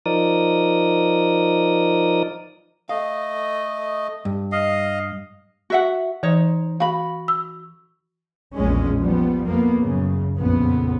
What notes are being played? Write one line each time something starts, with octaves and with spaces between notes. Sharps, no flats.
F3 D#4 A#4 D5 D#6
A3 D#5 F5
G2
D#5 F5
F#4 E5 F#5
E3 D#4 C5 C#5
F#4 F5 B5
E6
A#1 E2 A#2 G#3 C#4
F3 G3 B3
F2 A#3 B3
F#2 C#3
A#1 F2 C#3 B3